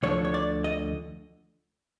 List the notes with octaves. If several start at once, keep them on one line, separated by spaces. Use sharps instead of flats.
D2 D3 F3 C#5
C#5
D5
D#5